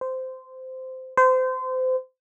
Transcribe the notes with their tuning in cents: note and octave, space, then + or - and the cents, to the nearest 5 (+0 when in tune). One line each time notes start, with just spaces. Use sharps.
C5 -15
C5 -30